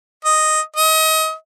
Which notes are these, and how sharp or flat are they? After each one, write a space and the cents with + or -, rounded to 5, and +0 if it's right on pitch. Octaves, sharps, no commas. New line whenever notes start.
D#5 -5
D#5 +30